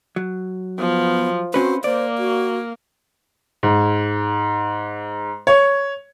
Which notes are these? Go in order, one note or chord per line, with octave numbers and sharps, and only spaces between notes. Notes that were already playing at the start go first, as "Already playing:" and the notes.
F#3
F3 B3
C4 C#4 F#4 B4 C5
A#3 C5 D5
F#4
G#2
C#5